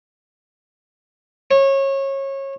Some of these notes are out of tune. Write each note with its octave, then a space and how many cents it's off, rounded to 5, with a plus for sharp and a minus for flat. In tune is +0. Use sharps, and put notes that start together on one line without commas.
C#5 -25